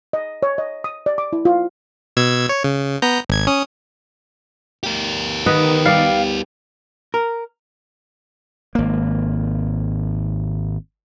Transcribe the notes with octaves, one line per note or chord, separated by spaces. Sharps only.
D#5
C#5
D#5
D#6
D5
D6
E4
F4
B2 E6 G#6
C#5
C#3
B3 A#5 G6
G#1 G#6
C#4 D#6
G4 A#4
D#3 B3 B4 D#5
G3 D5 F5
A#4
G#1 A#3